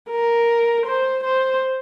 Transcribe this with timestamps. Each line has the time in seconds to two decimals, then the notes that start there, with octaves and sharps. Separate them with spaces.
0.11 A#4
0.86 C5
1.24 C5